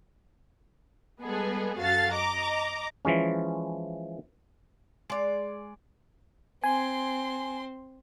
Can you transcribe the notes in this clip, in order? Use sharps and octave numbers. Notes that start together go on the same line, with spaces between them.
G3 G#3 B3 G#4 A4
F#2 F#4 A4 F5 A6
D#5 A#5 D6
E3 F3 G#3 C#4
G#3 D5
C4 G#5 C6